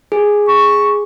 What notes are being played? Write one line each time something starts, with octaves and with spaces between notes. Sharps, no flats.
G#4
C#6